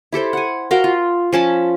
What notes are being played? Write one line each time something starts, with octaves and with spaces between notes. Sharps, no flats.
E4 G4 A4 C5
F#5 G#5
F#4 A#4 F5 G5
F4
F3 C#4 A5 B5